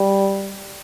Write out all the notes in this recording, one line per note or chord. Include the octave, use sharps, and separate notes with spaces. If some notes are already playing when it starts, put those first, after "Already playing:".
Already playing: G3